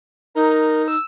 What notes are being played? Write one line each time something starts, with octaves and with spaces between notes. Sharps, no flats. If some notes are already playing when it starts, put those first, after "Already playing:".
D#4 A#4
E6